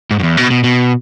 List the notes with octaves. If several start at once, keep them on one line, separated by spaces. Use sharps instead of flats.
G#2
F#2
E2
B2
B2
B2